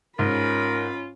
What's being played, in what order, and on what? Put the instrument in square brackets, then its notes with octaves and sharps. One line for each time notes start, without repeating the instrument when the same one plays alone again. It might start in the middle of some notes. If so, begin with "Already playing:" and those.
[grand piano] G#2 [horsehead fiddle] C#4 B5 [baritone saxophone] F4 [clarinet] A#4